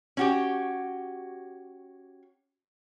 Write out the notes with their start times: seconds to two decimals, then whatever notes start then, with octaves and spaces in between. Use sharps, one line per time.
0.17 C#4 F#4 G4